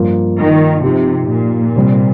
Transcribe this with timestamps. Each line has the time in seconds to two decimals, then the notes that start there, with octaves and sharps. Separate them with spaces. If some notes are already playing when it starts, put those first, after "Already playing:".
Already playing: G2 F3 A#3 F4
0.38 D#3
0.84 C3 F3 D#4 G4
1.30 A#2
1.76 C3 G3 C4